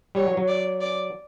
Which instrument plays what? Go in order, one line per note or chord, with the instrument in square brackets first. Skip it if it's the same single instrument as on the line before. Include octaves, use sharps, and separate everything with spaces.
[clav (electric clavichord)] G3 [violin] C#5
[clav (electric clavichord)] F#3
F#3
[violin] D5
D5